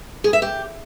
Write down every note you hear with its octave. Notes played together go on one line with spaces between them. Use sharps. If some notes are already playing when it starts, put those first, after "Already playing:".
G#4
E5
G4